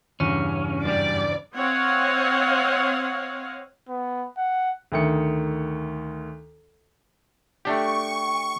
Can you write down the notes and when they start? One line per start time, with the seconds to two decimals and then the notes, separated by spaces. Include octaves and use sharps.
0.20 E2 G2 C#3 C#4
0.85 F#2 G3 D5
1.55 C4 C#5 D#5 F5 F#5
3.88 B3
4.37 F#5
4.92 D2 D#3 C#7
7.65 A3 D4 G4 G5 C#6